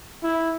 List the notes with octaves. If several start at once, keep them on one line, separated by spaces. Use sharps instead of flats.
E4